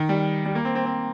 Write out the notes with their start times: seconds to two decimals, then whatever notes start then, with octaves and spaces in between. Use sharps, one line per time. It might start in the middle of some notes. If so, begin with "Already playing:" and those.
Already playing: D#3
0.09 G3
0.46 G3
0.55 A#3
0.65 C4
0.75 C4
0.85 C4